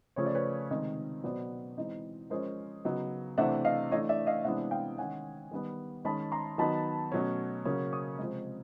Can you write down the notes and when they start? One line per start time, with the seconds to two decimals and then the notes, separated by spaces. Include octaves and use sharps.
0.16 C#3 F3 A3 C#4 C#5
0.26 D5
0.35 B4 C#5
0.70 C3 D#3 G#3 C4 D#4
1.24 B2 F#3 B3 C5 D5
1.77 E3 G#3 C4 D#4
2.30 F3 G#3 C#4 A#4 C5
2.85 C#3 F#3 B3 D#4
3.38 C3 E3 A3 D4 E5 F#5
3.65 D#5 F5
3.91 E3 A3 D4 C#5 D#5
4.09 D5 E5
4.26 D#5 F5
4.44 C3 E3 G#3 B3 D4 E5 F#5
4.71 F5 G5
4.98 D#3 G#3 C#4 F#5 G#5
5.51 D#3 G3 B3
6.05 D#3 G#3 C#4 A5 B5
6.32 A#5 C6
6.58 D#3 F#3 B3 D#4 A5 B5
7.12 B2 F#3 A3 C#4
7.65 C#3 F#3 A#3 C#4
7.93 C#6 D#6
8.19 C3 F3 G#3